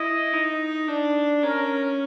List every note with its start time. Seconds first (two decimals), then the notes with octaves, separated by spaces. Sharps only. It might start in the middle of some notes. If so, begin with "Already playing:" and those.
Already playing: E4 D#5
0.33 D#4
0.88 D4
1.43 C#4 A#4